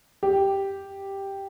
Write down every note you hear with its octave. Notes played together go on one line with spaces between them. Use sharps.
G4